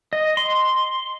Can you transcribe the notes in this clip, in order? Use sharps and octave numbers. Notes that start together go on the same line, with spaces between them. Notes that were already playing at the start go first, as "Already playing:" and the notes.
D#5
C6